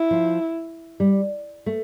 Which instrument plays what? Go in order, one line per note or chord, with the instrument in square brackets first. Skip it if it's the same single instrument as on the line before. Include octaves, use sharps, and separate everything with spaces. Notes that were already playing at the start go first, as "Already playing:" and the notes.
Already playing: [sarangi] E4
[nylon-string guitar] F3
G3
A3